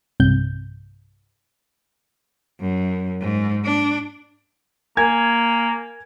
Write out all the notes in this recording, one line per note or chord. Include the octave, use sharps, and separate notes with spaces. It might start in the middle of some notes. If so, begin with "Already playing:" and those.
B1 G2 C3 G6
F#2
G#2
D4
A#3 A#4 G#5 G#6